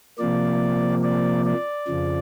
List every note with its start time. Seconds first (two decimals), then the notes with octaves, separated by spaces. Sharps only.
0.18 C3 F3 A#3 D5
1.03 D5
1.45 D5
1.88 F2 C#3 F3